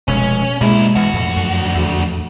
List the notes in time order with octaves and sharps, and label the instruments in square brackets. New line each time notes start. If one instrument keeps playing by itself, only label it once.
[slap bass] F1 G#3 [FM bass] B2 [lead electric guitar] C#4
[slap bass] B2 A#3 [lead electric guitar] G3 E4 [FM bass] G#3
[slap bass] B2 E3 [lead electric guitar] D3 F#4
[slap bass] F2 A2
[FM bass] F#2
E2